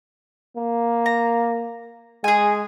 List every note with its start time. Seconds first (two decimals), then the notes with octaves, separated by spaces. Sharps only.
0.57 A#3
1.06 A#5
2.24 G#3 G#4 G#5